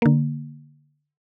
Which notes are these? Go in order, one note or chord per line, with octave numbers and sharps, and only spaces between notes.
D3 A#3